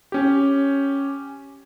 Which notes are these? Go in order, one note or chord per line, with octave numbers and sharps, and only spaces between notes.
C#4 G4